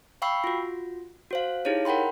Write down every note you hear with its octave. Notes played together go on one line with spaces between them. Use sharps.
F5 G5 B5 C#6 E6 C7
F4 F#4
F#4 C5 F5
D#4 E4 G4 G#4 C#5 F5
A#4 F#5 G5 B5 C6